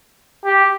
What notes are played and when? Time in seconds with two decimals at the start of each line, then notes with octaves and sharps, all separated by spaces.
0.45 G4